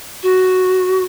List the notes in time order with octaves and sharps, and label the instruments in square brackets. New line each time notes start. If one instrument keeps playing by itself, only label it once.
[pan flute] F#4